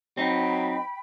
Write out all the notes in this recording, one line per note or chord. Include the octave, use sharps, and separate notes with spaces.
F#3 C4 D#4 G5 B5